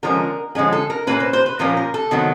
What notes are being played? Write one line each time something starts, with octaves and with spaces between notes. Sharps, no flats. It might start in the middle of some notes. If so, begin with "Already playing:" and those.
D3 F3 G#3 C#4 A#4
D3 F3 G#3 C#4 G#4
A4
A#4
A#2 F3 A#3 C#4 B4
C5
C5
B4
A#2 F3 A#3 C#4 A#4
A#4
A4
C3 D#3 F#3 B3